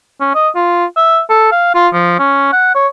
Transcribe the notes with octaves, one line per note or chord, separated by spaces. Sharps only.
C#4
D#5
F4
E5
A4
F5
F4
F3
C#4
F#5
C#5